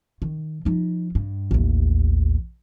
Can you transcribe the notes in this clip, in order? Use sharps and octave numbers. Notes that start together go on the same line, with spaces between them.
D#3
F3 D#4
G2
A1 D#2